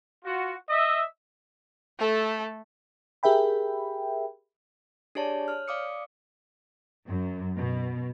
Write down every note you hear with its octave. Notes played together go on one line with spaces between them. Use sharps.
F4 F#4
D#5 E5
A3 A4
G4 G#4 A#4 E5 G5 B5
D4 G4 G#4 C#5 D5 A5
C#5 F6
D5 F5 D6 D#6 C#7
F#2
B2